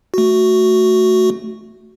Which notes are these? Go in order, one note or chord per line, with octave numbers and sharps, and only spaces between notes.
A3 F#4